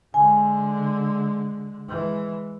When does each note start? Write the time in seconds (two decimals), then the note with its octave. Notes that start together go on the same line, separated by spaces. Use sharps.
0.14 D3 G#3 G#5
1.88 E3 G#3